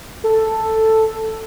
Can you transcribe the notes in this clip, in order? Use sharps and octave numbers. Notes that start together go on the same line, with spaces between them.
A4